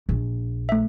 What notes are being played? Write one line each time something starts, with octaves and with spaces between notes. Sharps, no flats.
A#1
A3 E5